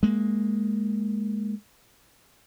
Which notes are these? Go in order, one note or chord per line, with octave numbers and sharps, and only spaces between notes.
G#3 A#3